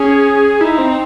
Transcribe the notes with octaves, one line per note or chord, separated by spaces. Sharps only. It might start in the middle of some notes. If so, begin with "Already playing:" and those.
Already playing: C#4 G#4
D#4 E4
C4